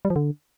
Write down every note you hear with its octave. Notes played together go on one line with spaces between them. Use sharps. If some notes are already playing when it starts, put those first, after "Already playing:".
G3
F3
D3